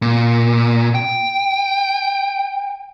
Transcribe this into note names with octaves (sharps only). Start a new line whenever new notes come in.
A#2
G5